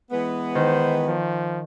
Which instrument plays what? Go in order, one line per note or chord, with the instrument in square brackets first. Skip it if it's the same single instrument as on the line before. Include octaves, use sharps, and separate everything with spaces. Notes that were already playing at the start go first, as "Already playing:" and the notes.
[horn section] E3 G#3 B3
[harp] D#3 [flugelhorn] C5
[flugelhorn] F3